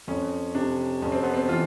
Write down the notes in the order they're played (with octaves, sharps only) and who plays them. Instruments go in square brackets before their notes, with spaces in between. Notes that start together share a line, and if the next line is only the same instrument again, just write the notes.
[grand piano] F2 [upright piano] C#4
[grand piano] C3 [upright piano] D4
[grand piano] F2 [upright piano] C#4
[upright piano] C4
B3
C4
[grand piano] E3 [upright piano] F4